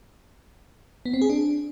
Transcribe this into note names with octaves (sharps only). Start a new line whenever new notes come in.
B3
C4
G#4
D4